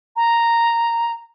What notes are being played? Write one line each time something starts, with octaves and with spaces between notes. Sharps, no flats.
A#5